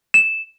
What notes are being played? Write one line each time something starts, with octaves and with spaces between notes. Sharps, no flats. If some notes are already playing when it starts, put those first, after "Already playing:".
E7